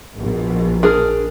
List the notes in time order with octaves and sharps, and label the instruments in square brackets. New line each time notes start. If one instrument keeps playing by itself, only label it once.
[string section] A#1 B2
[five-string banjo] D4 G#4 A#4